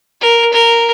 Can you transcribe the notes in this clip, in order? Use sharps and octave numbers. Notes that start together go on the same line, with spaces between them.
A#4
A#4